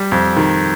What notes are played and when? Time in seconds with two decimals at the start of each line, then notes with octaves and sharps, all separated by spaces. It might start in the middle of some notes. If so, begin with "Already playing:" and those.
Already playing: G3
0.12 F2
0.37 D#3